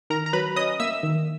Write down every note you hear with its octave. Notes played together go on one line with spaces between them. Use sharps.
D#3 A#4 A#5
A#5
F#3 B4 B5
C#4 D#5 D#6
A#3 E5 E6
D#3